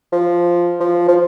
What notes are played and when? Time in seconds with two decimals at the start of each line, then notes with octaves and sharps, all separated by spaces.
0.12 F3
0.81 F3
1.08 F3